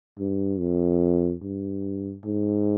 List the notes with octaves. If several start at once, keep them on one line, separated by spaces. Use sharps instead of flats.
G2
F2
G2
G#2